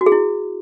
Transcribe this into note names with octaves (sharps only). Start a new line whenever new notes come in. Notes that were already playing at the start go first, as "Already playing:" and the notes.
F#4
G#4
E4